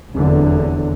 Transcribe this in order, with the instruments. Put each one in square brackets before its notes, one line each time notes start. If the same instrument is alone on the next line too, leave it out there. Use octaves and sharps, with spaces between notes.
[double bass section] F1 E2 D3 F#3